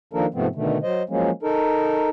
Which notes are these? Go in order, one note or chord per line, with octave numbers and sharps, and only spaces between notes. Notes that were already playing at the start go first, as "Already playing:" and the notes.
D#3 F3 A#3 D4 A4 A#4
G#2 C3 F3 A3 B3 C4
B2 D3 D#3 A3
F#3 C5 D#5
F3 F#3 G#3 A#3 C#4
D#4 A4 A#4